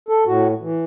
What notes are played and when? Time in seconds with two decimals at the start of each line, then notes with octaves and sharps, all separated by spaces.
0.09 A4
0.26 A2 F#4
0.61 E3